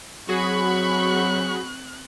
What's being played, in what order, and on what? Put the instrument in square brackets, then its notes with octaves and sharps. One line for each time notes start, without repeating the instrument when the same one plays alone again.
[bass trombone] F#3 [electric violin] C4 F#6 [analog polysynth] F#4 G#4 [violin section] B5 C#6